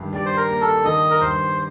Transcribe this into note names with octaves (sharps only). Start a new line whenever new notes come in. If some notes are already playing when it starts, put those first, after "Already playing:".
Already playing: G2 D#3
G3 D5
C5
A#4
A#3
A4
D#3 D#5
A#4
G2 C5